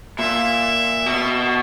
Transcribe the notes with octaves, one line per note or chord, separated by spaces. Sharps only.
A#2 E5
B2